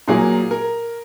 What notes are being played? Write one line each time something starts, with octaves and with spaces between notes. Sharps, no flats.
A#2 F#3 A#3 G#4
A#4